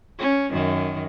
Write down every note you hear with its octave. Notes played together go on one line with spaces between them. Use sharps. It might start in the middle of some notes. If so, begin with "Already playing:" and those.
C#4
F#2 D#3